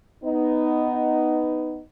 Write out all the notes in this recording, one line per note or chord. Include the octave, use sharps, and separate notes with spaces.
B3 D#4